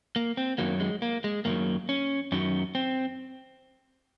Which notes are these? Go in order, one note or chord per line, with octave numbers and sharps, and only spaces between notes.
A#3
C4
F#2 D#3 F#3 A#3
G#3
A#3
G#3
F#2 D#3 F#3 A#3
C#4
F#2 D#3 F#3 C#4
C4